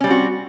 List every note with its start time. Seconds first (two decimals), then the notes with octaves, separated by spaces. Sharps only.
0.01 C#4
0.04 G3
0.07 C4
0.10 F#4